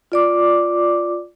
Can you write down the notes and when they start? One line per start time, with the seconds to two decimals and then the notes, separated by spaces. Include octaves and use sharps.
0.12 F4 D5 D6